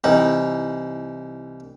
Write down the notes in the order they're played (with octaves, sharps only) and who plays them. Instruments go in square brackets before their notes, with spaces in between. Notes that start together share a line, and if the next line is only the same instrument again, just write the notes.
[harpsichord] C2 E3 D#4